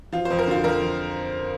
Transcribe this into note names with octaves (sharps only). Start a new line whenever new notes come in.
F3 F4
C5
F2
A#4
D3 F4
F2 A#4
F3